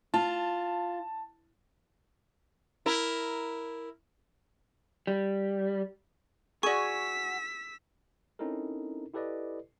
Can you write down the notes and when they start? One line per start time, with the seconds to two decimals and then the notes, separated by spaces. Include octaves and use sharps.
0.14 F4 A5
2.86 E4 A#4
5.07 G3
6.63 F#4 G#4 D5 G#5 C#6 E6 B6
8.39 C4 C#4 D#4 E4 A4 A#4
9.13 E4 G4 A4 B4 D5 D#5